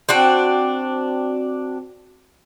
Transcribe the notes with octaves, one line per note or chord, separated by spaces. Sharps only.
C4 D4 F#4 G5